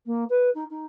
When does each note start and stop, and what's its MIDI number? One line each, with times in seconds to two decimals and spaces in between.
0.05 0.24 58
0.29 0.50 71
0.54 0.64 63
0.70 0.85 63